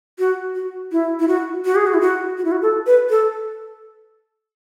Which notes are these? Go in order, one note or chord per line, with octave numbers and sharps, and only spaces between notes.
F#4
F#4
E4
E4
F#4
F#4
G#4
F#4
E4
F#4
F#4
E4
F#4
A4
B4
A4